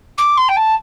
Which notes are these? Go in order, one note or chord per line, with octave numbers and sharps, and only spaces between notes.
D6
C6
G5
A5